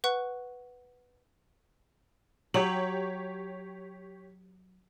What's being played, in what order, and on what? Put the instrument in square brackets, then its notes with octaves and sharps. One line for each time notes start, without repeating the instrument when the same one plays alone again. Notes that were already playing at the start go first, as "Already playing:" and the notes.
[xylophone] B4 F#5 C#6 F#6
[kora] F#3 [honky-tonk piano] G4 C#5 F#7